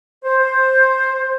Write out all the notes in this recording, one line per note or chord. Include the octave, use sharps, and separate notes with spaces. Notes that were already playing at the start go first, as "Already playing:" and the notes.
C5